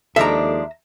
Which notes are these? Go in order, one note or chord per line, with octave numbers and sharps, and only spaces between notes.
D#2 F3 G#3 D4 A4 E5 A#5 D6